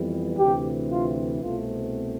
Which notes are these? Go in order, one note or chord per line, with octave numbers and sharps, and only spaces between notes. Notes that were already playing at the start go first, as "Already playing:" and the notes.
Already playing: F2 E3 G3 B3
D2 C3 E3 G4
F4
C2 B2 A3 C4 F4